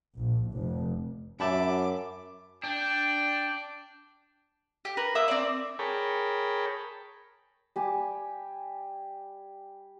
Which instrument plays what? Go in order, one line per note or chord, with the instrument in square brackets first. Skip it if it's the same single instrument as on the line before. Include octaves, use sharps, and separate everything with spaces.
[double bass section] A#1
F1
[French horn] F#2 [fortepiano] E5 A5 B5 [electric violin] D6
[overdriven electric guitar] D4 [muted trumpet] G5
[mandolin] G4
A#4 B4
A#3 E5 D#6
C4 D5
[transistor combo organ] G#4 A#4 C#5 G5 A5 B5
[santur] G3 G4 G#5